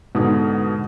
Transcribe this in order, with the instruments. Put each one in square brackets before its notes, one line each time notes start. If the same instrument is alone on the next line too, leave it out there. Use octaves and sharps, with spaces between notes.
[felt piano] G#2 D#6 [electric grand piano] B2 D3